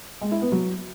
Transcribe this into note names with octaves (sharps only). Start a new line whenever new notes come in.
G#3
E4
B3
F#3